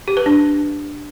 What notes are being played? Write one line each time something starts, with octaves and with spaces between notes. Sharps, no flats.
G4
B4
D4